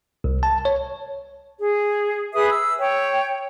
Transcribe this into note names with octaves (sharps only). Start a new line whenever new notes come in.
C2
A5
C#5
G#4
G#4 B4 E5 D#6
E6
C#5 G5